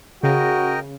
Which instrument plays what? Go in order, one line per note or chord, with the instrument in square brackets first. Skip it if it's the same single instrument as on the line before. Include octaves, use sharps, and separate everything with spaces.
[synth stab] C#3 [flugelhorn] F#4 [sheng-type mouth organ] A#4 D#5 G5